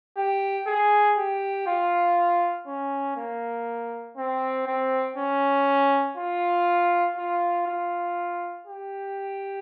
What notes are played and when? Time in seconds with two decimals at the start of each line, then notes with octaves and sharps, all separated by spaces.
0.17 G4
0.67 G#4
1.17 G4
1.67 F4
2.67 C#4
3.17 A#3
4.17 C4
4.67 C4
5.17 C#4
6.17 F4
7.17 F4
7.67 F4
8.67 G4